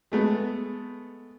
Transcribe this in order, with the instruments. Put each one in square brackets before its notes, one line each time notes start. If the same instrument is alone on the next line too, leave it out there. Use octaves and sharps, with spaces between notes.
[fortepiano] G#3 A3 B3